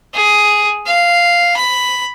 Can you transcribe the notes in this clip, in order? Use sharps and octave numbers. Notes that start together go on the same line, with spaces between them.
G#4
F5
B5